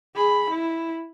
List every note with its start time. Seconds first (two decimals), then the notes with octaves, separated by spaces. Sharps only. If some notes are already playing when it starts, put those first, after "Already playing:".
0.15 G#4 B5
0.50 E4